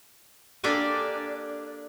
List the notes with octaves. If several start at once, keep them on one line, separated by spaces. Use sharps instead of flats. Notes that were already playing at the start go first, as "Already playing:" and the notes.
A#3 D4 G4 A4 D5 G#5